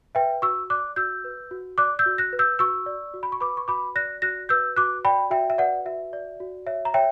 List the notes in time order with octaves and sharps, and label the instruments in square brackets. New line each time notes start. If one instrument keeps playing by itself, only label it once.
[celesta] B4 E5 G5
F#4 C#6 E6
D5 D6 F#6
F#4 E6 G6
B4
F#4
D5 D6 F#6
E6 G6
F#4
F#6 A#6
B4
E6 G6
F#4 C#6 E6
D5
F#4
B5
C#6
B4 B5 D6
C#6
F#4 B5 D6
D5 F#6 A#6
F#4 F#6 A#6
B4 E6 G6
F#4 D6 F#6
D5 G5 B5
F#4 E5 G5
E5
B4 D5 F#5
F#4 E5
D5
F#4
C#5 E5
A#5
C#5 E5 G5